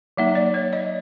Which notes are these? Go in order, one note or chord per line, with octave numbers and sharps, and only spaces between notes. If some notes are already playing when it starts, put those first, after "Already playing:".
F#3 A#3 D#4 E5
D5
C#5
D#5